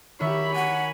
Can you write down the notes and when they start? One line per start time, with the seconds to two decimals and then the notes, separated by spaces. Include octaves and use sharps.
0.20 D#3 F#4 G4 C#5 E5 B5
0.56 F#5 G#5